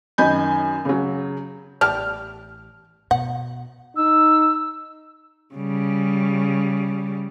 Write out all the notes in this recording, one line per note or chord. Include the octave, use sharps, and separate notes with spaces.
F#2 D#3 D#5 G#5 B5 G6
C#3 F#3
A1 G3 D5 A5 F6
B2 F#5
D#4 E6
C#3 G3